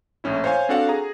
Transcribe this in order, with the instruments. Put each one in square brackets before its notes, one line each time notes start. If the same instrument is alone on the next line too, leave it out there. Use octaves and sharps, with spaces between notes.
[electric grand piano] A#1 A2 C#4 E4
C5 C#5 F5 G#5
C4 D4 F#4 A4 F5 F#5
G#4 A#5